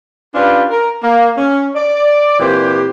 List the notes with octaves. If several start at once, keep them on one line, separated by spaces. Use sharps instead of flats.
C#4 D4 F4 G4 B4 D5
A#4
A#3
C#4
D5
A#2 E3 C4 G4